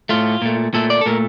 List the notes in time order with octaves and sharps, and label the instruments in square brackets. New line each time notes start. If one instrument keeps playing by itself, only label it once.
[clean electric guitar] A2 A3 F4
A#2 A3
A#2 A3 A4
D5
A4
A#2 A3 A#4